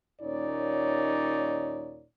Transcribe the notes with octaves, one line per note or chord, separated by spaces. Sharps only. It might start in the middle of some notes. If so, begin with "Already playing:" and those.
D#2 A#2 C#4 D#4 C#5 D5